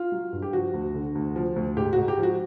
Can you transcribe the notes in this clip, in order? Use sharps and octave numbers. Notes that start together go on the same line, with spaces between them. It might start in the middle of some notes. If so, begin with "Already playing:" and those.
Already playing: F4
F#3
G2
G4
F3 F#4
D2
D3
D2
F3
D2
G#2 G4
G#2 F#4
G4
F3 F#4